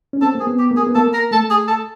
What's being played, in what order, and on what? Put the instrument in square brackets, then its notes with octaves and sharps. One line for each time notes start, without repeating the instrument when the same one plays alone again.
[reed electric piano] C#4
[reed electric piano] C4 [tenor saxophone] A4
[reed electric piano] A#3 [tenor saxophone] G#4
[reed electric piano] B3
[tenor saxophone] G4
[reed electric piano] A#3
[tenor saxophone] G#4
[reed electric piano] B3
[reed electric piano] A#3 [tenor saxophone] A4
[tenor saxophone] A#4
[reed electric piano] A3 [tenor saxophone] A4
[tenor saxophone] G#4
A4